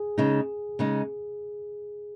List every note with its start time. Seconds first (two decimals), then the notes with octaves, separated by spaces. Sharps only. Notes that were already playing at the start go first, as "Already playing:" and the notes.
Already playing: G#4
0.18 C#3 G#3 D#4
0.79 C#3 G#3 D#4